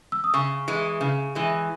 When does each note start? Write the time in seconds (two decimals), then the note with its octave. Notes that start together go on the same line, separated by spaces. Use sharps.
0.12 E6
0.24 D#6
0.34 C#3 C#6
0.68 E3 G#3
1.01 C#3
1.35 E3 G#3